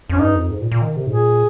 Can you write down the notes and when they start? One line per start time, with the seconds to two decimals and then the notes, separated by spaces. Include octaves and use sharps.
0.09 F2 C#4
0.19 G2 D#4
0.35 F2
0.51 G#2
0.61 A#2
0.72 A#2
0.82 D#3
0.96 C3
1.07 G#2
1.11 A#2 G#4